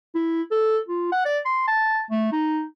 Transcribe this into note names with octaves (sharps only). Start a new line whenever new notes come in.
E4
A4
F4
F#5
D5
C6
A5
A3
D#4